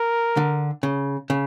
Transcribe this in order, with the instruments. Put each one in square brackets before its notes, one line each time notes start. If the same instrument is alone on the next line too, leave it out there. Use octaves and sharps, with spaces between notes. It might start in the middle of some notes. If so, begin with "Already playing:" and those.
Already playing: [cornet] A#4
[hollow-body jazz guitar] D3
C#3
C#3